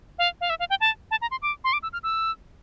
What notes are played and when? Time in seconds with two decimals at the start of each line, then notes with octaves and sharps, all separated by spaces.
0.19 F5
0.41 F5
0.50 E5
0.59 F5
0.70 G5
0.81 A5
1.11 A5
1.22 A#5
1.31 C6
1.42 D6
1.64 C6
1.73 D6
1.83 E6
1.93 F6
2.03 E6